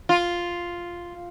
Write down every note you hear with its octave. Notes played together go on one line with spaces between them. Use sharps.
F4